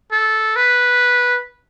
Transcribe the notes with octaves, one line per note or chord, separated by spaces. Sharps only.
A4
B4